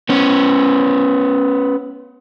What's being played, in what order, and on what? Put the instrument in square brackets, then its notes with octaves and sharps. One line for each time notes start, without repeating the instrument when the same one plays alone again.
[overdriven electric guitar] B3 C#4